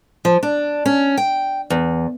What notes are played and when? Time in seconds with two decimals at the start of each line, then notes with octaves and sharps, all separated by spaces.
0.25 F3
0.43 D4
0.86 C#4
1.17 G5
1.70 E2